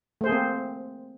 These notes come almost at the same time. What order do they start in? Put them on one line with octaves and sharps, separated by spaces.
A3 C5 G#4 A#3 C4